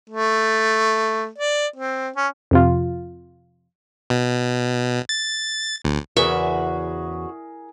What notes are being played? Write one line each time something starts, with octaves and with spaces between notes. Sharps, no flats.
A3
D5
C4
C#4
F2 C3 F4
B2
A6
D2
E2 C#3 F#4 G#4 A#4 E5